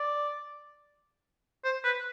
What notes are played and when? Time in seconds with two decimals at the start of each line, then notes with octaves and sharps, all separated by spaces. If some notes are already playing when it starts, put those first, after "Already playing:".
Already playing: D5
1.64 C5
1.84 B4